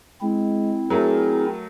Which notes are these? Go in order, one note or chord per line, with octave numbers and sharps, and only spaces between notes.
G#3 C4 E4
F#3 A3 G#4 A#4